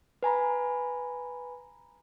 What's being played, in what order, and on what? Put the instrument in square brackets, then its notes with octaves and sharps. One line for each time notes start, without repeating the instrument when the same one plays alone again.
[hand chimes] B4 G#5 A#5 B5